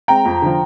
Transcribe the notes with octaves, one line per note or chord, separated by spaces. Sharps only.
G#3 C4 G5 A#5
F2
D3 F3